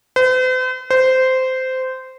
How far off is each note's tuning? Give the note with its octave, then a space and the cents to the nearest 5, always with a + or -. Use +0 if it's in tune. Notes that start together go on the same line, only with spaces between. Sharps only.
C5 -45
C5 -15